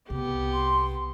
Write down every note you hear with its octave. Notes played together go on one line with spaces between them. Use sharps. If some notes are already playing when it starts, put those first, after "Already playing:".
C2 B3 G4
C6